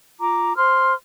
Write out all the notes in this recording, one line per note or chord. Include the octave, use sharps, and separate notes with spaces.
F4 A#5 D6
C5 C6 F6